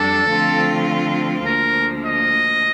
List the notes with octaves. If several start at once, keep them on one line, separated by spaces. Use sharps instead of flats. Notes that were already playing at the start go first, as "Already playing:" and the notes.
Already playing: F2 G3 D4 A4
D3 F3 A3 C4 F4
D2 D3 F3 A#3 A#4
D#5